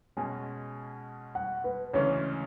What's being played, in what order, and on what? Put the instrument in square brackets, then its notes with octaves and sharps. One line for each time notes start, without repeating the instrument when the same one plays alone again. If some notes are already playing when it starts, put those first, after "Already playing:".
[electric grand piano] B2 G#3 C#4 [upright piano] G#5
[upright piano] F#5
B4
[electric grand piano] D2 C#3 E3 G#3 C#4 [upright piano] C#5